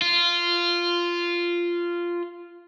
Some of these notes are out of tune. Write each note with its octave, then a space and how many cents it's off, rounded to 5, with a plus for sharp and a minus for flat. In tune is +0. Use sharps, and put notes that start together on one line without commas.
F4 -10